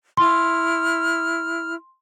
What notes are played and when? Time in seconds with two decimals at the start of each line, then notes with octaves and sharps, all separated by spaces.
0.17 E4 C6 F6